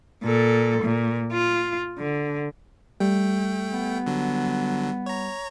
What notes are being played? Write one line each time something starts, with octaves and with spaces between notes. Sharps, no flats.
A#2 A4
A#2
F4
D3
G3 A3 G5
B3
D3 F#3
C#5 A#5